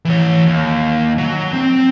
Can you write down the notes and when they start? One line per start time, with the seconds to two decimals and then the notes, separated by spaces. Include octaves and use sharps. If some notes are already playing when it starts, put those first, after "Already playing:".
0.05 E3 C#5
0.46 D#2
1.18 F#3
1.53 C4